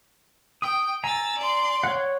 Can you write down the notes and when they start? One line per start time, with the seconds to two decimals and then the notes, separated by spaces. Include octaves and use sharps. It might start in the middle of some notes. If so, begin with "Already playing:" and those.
0.62 G5 D#6
1.04 G#5 A#5 E6 A6
1.38 D5 C6
1.83 C#5 F#5